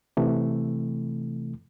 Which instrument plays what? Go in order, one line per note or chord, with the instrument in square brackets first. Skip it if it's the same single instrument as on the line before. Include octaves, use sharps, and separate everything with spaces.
[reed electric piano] C3 E3 A3